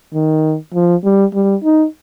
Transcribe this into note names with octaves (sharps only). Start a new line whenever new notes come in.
D#3
F3
G3
G3
D#4